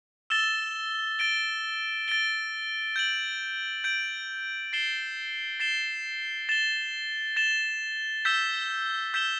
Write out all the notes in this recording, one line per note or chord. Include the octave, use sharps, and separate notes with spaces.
E6 A6 E7 G7
A6 D7 G7
A6 D7 G7
G6 D7 F#7
G6 D7 F#7
A6 C7 E7 G7
A6 C7 E7 G7
A6 E7 G7
A6 E7 G7
E6 G6 B6 E7 G7
E6 G6 B6 E7 G7